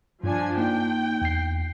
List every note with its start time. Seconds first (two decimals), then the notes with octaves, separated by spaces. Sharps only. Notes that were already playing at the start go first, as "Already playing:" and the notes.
0.24 G2 F3 D4 G#5
0.57 A#3 D#4 G5
1.21 E2 C7